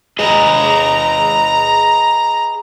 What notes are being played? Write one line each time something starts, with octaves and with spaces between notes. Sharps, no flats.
G#4 B4 D#5 A#5